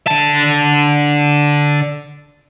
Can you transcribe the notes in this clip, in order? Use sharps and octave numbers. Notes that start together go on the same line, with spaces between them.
D3 A5